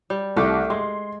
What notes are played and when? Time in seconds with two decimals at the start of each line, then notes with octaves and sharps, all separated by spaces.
0.10 G3
0.36 C2 A3 G4
0.70 G#3 C6